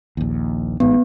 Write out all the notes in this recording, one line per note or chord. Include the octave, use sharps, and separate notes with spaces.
A#1 D#2
A1 G#2 B3